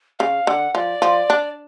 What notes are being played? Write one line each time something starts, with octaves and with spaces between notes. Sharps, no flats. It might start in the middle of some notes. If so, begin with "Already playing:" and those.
C#3 F5
D3 F#5
F3 D5
F3
D4